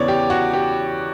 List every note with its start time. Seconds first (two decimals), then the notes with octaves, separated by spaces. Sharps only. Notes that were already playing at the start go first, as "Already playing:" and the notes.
Already playing: E2 C#3 E3 B3 C#5 D5
0.08 G4
0.30 F#4
0.53 G4